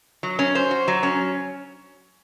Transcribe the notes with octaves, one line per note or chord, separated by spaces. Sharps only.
F#3
C#4
C5
F#4
F#3
C#4